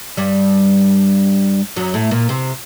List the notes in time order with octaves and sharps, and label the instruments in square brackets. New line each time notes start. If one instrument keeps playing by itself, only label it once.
[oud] G2 G3
F#2 F#3
A2 A3
A#2 A#3
C3 C4